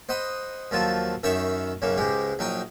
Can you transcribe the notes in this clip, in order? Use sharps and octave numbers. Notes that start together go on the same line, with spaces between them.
C5 D#5 F#5 B5
D#2 F3 F#3 F4 A4
F#2 D#3 C#5 E5 B5 C#6
B1 F#2 C#3 F#3 A#3
C#2 G#2 G#3 G4
A#1 F#3 D#4 G5 A#5